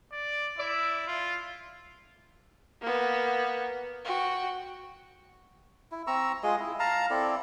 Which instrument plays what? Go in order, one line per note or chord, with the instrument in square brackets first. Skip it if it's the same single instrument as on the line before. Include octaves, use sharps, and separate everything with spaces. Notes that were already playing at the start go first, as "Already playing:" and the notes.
[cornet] D5
[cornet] E4 [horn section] D5 E5
[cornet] F4
[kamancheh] A#3 B3
F#4 G5
[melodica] E4
C4 A#5 C#6 E6
G#3 F4 G#4 D#5
E4
F5 A5 A#5
C4 E4 A4 D5